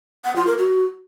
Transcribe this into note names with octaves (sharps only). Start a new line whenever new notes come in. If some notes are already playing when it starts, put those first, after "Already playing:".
F#5
F4
A#4
F#4